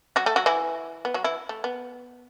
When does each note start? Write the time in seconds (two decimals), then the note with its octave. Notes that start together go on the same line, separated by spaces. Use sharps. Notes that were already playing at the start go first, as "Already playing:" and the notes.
0.16 F#3 F#4
0.26 A3 A4
0.36 F#3 F#4
0.46 E3 E4
1.05 B3
1.14 F#3 F#4
1.24 E3 E4
1.49 A3
1.64 B3